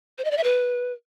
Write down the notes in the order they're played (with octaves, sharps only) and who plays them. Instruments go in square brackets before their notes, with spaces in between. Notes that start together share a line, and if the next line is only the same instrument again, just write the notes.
[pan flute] C5
D#5
D5
E5
B4